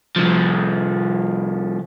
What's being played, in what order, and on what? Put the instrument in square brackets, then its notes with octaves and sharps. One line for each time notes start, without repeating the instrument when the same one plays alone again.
[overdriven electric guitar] C2 F3